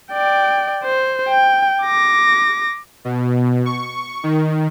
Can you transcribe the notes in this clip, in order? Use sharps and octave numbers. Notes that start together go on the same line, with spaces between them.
D5 G5
C5
G5
D6 A#6
B2
C#6
D#3